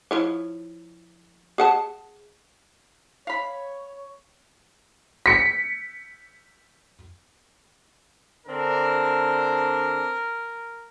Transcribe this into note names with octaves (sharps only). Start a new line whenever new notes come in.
F3 E4 C#5
G#4 F#5 A5
C#5 F5 B5
B6 C#7
D3 C4 D4 A#4